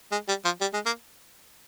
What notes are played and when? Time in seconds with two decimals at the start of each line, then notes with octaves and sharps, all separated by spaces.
0.12 G#3
0.28 G3
0.45 F3
0.61 G3
0.74 G#3
0.86 A#3